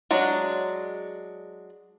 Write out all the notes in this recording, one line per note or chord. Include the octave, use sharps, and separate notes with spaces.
F#3 G#3 D4